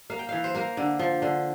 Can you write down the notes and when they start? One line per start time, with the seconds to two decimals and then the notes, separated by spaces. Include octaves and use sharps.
0.10 A#3 F5
0.19 G5
0.29 E3 F5
0.44 C5
0.55 A#3 A#4
0.77 D3
0.99 F3
1.22 D3